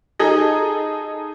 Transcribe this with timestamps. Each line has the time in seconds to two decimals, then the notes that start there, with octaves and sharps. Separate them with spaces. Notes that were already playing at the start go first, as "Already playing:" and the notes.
0.19 D#4 G#4 A4 D#5